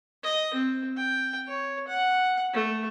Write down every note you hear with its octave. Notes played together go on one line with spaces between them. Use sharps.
D#5
C4
G5
C#5
F#5
A3